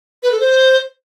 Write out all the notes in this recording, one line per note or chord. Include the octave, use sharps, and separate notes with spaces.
B4
A4
C5